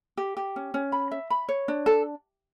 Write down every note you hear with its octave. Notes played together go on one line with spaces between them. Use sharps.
G4
G4
C#4
C#4
B5
E5
B5
C#5
D4
A4